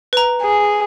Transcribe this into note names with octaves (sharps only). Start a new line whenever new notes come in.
B4 A#5
G#4